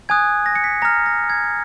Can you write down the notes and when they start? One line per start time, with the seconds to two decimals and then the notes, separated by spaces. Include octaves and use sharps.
0.09 G#5 D#6 F#6 G#6
0.46 A#6
0.55 C#7
0.64 B6
0.82 A#5 F6 A#6
1.06 A#6
1.30 G#6